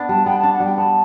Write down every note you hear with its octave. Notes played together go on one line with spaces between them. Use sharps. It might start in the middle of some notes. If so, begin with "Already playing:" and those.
Already playing: B3 D4
G3 A5
B3 G5
D4 A5
F#5
G3 G5
B3 A5